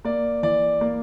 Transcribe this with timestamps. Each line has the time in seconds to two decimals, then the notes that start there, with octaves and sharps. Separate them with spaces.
0.05 A#3 D5
0.43 E3 D5
0.81 A#3